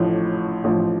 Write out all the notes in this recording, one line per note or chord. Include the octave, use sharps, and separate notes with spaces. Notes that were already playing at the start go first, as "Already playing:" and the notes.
Already playing: A1 A2 F3
A1 A2 F3